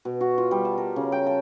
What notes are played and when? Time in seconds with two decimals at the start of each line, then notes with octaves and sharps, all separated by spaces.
0.05 B2
0.21 F#4
0.38 F4
0.51 G3
0.65 A5
0.77 A#4
0.96 C#3
1.12 G5
1.27 A5